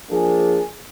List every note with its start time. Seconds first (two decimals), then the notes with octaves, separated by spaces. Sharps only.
0.10 F3 A#3 D4 G#4